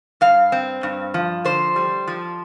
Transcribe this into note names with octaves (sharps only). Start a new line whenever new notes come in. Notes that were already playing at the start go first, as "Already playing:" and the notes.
G2 F5
C4
G2
F3
D3 C5
G3
F3